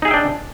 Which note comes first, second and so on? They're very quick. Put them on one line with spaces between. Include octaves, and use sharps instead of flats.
D#4 G#4 E5 G5 D4